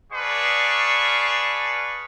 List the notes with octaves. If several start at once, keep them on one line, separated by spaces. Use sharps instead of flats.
G#4 B4 D5 F5 A5 C#6